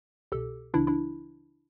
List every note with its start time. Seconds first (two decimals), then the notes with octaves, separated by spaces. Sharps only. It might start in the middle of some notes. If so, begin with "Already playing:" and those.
0.32 C2 B2 G4 A4
0.74 C#2 C#3 E3 D4 E4
0.87 D4 E4